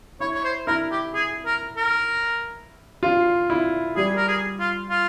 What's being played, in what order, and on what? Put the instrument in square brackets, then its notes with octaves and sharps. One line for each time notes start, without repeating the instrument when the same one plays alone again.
[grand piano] E4 [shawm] C#5
[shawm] C#5
C5
[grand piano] E4 [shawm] A#4
[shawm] G4
G#4
A#4
A#4
[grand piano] F4
E4
[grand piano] G3 [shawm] G#4
[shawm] A#4
G#4
F4
F4